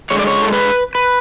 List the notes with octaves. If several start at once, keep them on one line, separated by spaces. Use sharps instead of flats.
D3 G#3 C#5
D5
C#5
A4
B4
B4